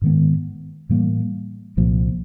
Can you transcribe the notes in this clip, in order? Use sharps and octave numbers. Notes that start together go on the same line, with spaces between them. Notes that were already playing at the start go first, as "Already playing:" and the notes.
G#2 D#3 G#3 B3
A2 E3 G3 A#3
C2 A#2 F3 A#3